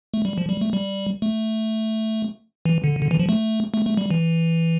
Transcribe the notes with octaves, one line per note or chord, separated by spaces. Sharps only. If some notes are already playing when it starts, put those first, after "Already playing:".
A3
G3
F3
G3
A3
G3
A3
E3
D3
D3
E3
F3
A3
A3
A3
G3
E3